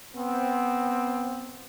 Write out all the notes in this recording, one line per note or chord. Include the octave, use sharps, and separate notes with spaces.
B3 C4